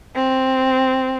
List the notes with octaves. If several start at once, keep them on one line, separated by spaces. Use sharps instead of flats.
C4